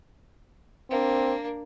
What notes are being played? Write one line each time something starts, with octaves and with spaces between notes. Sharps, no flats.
A#3 C4 D4